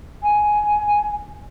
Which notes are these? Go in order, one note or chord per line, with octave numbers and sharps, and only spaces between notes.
G#5